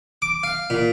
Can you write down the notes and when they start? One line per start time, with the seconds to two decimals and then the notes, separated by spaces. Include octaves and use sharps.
0.22 D6
0.43 F5
0.70 A#2